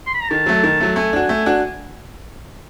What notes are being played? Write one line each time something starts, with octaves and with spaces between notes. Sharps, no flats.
C6
B5
A#5
D#3 A5
F#3 A3
D#3
F#3 A3
A3 G#5
D4 F#4
A3
D4 F#4